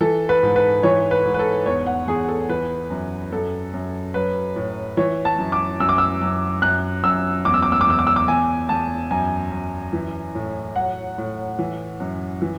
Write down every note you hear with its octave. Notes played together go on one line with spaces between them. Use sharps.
E3 A4
B4
G#2
B4
E3 C#5
B4
G#2
B4
A4
E2 C#5
F#5
E2 G#4
A4
E3 B4
F#2
F#2 A4
F#2
F#3 B4
A2
E3 C#5
A5
F#2
D6
F#2 E6
D6
E6
F#2
F#2 F#6
F#2 E6
E2 D6
E6
D6
E6
D6
E2 E6
D6
E6
D6
E2 G#5
E2 A5
F#2 G#5
F#2
E3
A2
F#3 F#5
A2
E3
F#2
E3